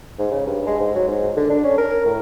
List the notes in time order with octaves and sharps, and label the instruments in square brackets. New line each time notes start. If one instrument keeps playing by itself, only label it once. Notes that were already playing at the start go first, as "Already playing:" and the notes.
[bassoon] G#2
C#3
G2
G#3
G#2
F#3
G#2
D3
D4
C#4
A#4
A2